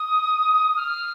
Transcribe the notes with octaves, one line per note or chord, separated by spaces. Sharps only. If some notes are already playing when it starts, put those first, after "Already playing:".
Already playing: D#6
F6